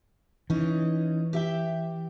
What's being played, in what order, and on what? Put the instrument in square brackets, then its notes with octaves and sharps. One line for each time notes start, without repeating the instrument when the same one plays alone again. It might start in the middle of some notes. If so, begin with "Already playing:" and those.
[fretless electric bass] E3 [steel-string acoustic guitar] C#4 D#4
[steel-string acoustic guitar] G4 E5 G5